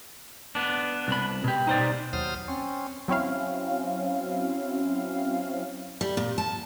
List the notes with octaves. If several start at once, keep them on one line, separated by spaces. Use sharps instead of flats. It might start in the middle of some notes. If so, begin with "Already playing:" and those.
B3 D4
C2 B5
B2 G4
D#4 C5 D5
D#2 F#3 C5 D#6 F6
C4 C#4
F#3 C4 C#4 E4 F5
G3
A#2
A5